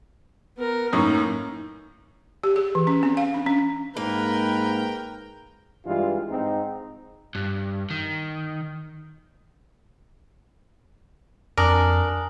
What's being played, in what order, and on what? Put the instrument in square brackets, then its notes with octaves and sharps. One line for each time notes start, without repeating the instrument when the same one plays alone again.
[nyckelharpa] B3 A#4
[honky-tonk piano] F#2 A2 C#4 [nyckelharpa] A#3 [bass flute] D#4
[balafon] G4
G#4
E3
C#4
C4
F5
D4
C#4
[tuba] G#2 [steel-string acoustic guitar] A#3 [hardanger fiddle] A#4 G5 [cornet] B4
[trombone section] G2 E3 G#3 F4
G#2 C4 D#4
[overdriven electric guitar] G2
D#3
[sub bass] F2 [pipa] D4 [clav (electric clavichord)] A#4 [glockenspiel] G#5 D#6 F#7